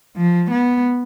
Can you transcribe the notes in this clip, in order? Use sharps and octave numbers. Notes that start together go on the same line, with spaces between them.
F3
B3